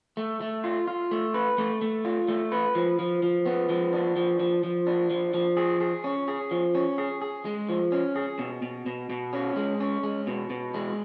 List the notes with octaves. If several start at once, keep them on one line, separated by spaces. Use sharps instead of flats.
A3
A3
F4
F4
A3
B4
A3
A3
F4
A3
B4
F3
F3
F3
B3
F3
D4
F3
F3
F3
D4
F3
F3
G#4
G#4
C#4
G#4
F3
C#4
G#4
G#4
G#3
F3
C#4
G#4
B2
B2
B2
B2
C#4
G#3
C#4
G#3
B2
B2
G#3